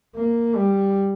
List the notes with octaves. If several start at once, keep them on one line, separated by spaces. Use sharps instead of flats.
A#3
G3